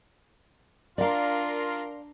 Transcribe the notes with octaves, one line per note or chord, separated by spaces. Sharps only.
D4 F4 A#4 D5 F5 A#5 C6